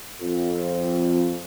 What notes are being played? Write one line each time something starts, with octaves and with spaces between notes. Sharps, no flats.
F2